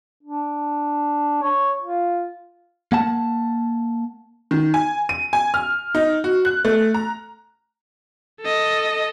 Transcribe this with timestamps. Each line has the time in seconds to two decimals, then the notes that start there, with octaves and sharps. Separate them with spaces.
0.23 D4
1.42 C#5
1.81 F4
2.92 A#3 F#5 A5
4.51 D#3
4.74 G#5
5.09 D#7
5.33 G#5
5.54 F6
5.95 D#4
6.24 F#4
6.45 F#6
6.65 A3
6.94 A#5
8.41 A4 D#5